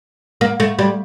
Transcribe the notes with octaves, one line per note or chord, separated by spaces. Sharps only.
A#3
A3
G3